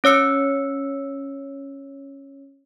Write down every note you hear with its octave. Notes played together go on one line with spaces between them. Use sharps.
C#4 C#5 E6 C#7